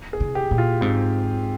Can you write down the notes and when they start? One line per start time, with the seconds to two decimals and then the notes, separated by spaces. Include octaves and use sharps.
0.13 G#4
0.20 C3
0.35 G4
0.51 A#2
0.58 F4
0.81 G#2 C4